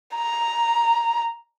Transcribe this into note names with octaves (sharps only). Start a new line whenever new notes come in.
A#5